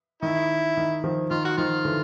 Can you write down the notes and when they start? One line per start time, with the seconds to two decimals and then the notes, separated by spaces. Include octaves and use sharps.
0.22 D#3 E4
0.77 D#3
1.04 D#3 F3
1.31 D#3 F4
1.45 F#4
1.57 D#3 F3 F4
1.85 D3 E3